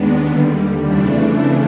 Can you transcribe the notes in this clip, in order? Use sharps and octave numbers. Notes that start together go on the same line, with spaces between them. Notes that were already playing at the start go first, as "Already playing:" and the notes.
Already playing: D#2 D#3 G#3 B3 D4
D#2 D3 G3
F2 C#3 E3 A3 D4